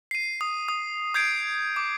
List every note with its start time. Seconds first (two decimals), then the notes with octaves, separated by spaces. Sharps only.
0.11 C7 D#7
0.41 D#6
0.68 D#6
1.14 D#6 G6 G#6 C7 D7
1.76 D6